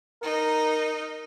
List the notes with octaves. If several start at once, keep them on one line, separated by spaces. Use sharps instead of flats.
D#4 A#4